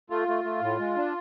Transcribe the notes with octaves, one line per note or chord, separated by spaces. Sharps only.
A3 F4
A3
A3
A2
G#3
D4